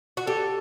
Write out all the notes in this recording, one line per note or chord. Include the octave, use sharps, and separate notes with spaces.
F#4
G4 A4